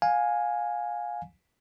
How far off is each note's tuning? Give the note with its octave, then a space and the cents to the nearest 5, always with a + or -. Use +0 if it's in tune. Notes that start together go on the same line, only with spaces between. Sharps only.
F5 +20 G#5 +0